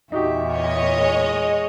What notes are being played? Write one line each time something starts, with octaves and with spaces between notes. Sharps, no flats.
E2 A#2 D#4 F#4 G4 E5
C#5 D#5
G#3